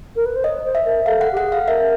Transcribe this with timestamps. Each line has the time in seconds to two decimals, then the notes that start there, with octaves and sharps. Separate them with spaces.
0.16 A#4
0.25 B4
0.35 C5
0.44 C#5 D#5
0.64 C5
0.75 E5
0.85 A#4
1.06 A4 F5
1.21 F#5
1.32 G4
1.37 G#4 F#5
1.52 F5
1.67 A#4 E5